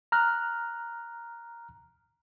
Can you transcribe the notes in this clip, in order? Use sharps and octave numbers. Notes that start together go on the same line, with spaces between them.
A#5 F6 F#6